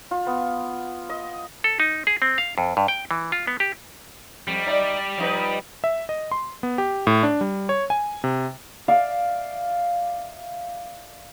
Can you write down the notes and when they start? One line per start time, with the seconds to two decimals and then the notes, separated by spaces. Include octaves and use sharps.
0.11 F4
0.27 B3
1.09 D#5
1.64 A4
1.80 D#4
2.07 G#4
2.22 C4
2.38 F5
2.58 F2
2.77 G2
2.88 G5
3.11 E3
3.32 F4
3.47 B3
3.60 G4
4.48 F2 G3
4.66 D#4 D5 E5
5.18 F3 D#4 B4
5.84 E5
6.09 D#5
6.31 C6
6.63 B3
6.78 G4
7.07 A2
7.23 D4
7.41 G3
7.69 C#5
7.90 G#5
8.24 C3
8.88 D5 E5 F5